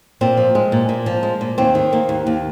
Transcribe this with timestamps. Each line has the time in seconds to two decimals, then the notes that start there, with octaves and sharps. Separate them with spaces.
0.21 A#2 C4
0.37 F3
0.55 G#3
0.72 A#2
0.89 A#2
1.06 F3
1.23 G#3
1.41 A#2
1.58 D#2 C4
1.75 D#3
1.93 A#3
2.09 D#2
2.27 D#2